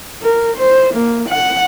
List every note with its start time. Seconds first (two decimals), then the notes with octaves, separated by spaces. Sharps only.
0.22 A#4
0.57 C5
0.94 A#3
1.29 F#5